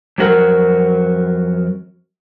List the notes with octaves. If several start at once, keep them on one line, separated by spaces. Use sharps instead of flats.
F2 F#3 F#4 A#4